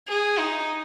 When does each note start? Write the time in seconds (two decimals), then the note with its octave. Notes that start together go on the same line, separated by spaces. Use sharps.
0.08 G#4
0.39 D#4